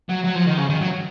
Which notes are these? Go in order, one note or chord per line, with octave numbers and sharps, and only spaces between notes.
F#3
F#3
F3
D#3
C#3
D#3
F#3